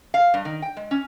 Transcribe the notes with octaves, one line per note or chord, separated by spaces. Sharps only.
F5
G2
D#3
G5
G#3
C#4